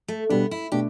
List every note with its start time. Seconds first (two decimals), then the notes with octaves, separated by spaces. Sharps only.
0.08 A3
0.30 B2 G3 B3 D4
0.51 E4
0.72 B2 A3 D4 G4